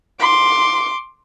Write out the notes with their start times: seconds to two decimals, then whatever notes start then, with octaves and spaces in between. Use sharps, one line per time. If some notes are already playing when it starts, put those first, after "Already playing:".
0.20 C6 D6